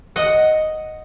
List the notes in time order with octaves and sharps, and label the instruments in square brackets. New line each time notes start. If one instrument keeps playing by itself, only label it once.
[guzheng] D#5 F#5